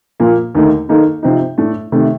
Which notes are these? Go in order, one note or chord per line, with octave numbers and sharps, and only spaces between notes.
A#2 F3 A#3
D#2 D3 A3 D#4 A#4
D#3 A#3 D#4 A4
C3 F3 C4 D#4
A2 A3 D4 A4
C3 D#3 A3